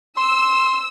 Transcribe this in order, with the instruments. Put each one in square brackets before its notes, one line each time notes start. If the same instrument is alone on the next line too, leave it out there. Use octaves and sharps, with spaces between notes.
[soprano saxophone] C6 [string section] E6